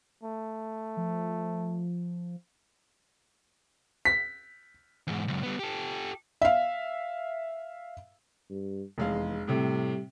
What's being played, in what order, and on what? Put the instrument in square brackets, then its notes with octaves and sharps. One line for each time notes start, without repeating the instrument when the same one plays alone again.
[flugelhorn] A3
[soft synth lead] F3
[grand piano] B6
[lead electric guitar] E2 G#2
C#2 F#2
G3 B3
G4 A4
[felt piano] E5 F5
[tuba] G2
[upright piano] F1 G#3 F5 [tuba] E2
[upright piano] A2 C3 [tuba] G3